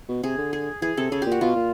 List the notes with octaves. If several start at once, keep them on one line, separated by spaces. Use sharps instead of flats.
B2
C3 G#4
D3
G#4
E3 G#4
C3 A4
C#3 G#4
A#2 G4
F#4
B2 F4
A#2